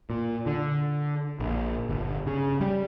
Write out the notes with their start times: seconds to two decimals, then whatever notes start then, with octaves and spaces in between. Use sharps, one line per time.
0.10 A#2
0.46 D3
1.40 A#1
1.89 G1
2.26 C#3
2.61 G3